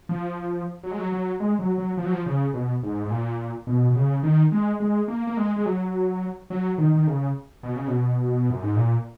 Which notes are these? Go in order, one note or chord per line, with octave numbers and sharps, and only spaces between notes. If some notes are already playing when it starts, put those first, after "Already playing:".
F3
F#3
G#3
F#3
F#3
G#3
F#3
F#3
F3
F#3
F3
C#3
B2
G#2
G#2
A#2
B2
B2
C#3
D#3
G#3
G#3
A#3
A#3
G#3
G#3
F#3
F#3
D#3
D#3
C#3
B2
C#3
B2
F#2
G#2
A#2